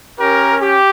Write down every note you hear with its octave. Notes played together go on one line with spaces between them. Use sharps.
C#4 G4 A#4
G4